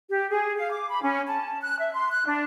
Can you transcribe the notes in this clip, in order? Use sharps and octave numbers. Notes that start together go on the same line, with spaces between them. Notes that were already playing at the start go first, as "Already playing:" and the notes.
G4
G#4
F5
D6
B5
C#4
A5
F#6
E5
C6
F#6
D4